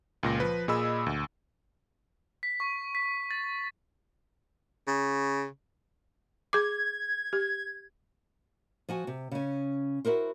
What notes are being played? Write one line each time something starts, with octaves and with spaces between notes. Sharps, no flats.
C#2 A#2 A#6
F3 B4
A#2 G#4 D#5 B5 E6
D2
B6
C#6
B6
A6
C#3
G#4 D6 G#6
G4
F3 F#4 G#5
C3
C#3 C#4
E4 F#4 A#4 C5